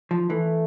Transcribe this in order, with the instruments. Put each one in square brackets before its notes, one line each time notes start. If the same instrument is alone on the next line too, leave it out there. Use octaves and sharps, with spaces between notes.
[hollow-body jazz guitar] F3
[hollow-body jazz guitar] E3 [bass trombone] A3